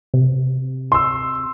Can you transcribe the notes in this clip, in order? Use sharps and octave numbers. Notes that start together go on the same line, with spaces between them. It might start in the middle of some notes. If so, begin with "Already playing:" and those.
C3
C6 E6